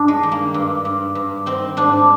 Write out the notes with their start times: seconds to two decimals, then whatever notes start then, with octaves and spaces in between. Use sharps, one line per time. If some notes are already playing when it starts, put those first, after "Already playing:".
Already playing: G2 D4
0.08 G#3
0.23 D#3
0.32 A#3
0.54 G2
0.85 G2
1.15 G2
1.46 D#3 C4
1.77 G#2 D4